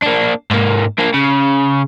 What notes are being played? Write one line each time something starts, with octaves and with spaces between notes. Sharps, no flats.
A#3 D4
G#2 A#3
A#3 D4
C#3